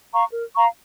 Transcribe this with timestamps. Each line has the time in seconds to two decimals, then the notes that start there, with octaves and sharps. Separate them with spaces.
0.13 F5 A#5 C#6
0.33 A#4
0.54 F5 A#5 C#6